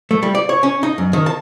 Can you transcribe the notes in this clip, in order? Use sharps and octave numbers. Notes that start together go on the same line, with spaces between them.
A3
G3
D5
C#5
C#4
D#4
F#2
D#3
A5